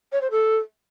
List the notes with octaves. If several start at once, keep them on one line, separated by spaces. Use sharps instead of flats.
C#5
C5
A4